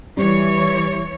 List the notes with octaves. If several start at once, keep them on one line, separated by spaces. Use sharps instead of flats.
E3 G3 C#5